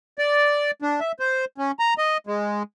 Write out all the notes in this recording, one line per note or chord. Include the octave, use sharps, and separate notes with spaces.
D5
D4
E5
C5
C#4
A#5
D#5
G#3